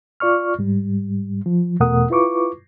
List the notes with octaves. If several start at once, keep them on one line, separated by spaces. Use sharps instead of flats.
F4 D5 C#6 F6
G#2 G3
F3
E2 B2 A3 A#4 F#5 D#6
E4 F4 B4 C#6 D6